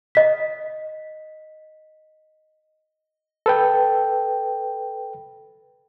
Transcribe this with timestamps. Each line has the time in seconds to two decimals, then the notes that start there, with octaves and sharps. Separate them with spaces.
0.15 D#5 B6
3.46 A4 B4 G5